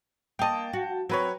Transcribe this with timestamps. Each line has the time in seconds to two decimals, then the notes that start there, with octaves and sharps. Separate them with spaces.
0.39 A#3 D#5 G5 A5
0.73 F#4
1.10 F#3 C4 B4 C#5